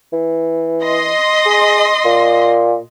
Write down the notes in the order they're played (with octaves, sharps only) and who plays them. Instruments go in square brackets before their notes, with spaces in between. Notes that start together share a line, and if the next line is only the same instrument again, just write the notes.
[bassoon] E3
[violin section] D#5 C6
[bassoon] G#4
A#2